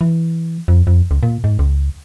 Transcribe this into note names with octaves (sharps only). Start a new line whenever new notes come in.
E3
F2
F2
C#2
A#2
G#2
C#2